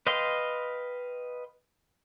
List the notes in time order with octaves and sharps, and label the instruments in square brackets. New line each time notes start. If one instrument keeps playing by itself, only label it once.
[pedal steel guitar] B4 D#5 F5 G5 C6